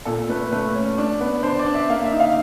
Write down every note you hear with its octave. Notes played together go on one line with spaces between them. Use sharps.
A#2 A4
A3 B4
A3 B4
C#4
D4
B3
D4 C5
D5
D4
E5
A#3 F5
E5
D#4
F5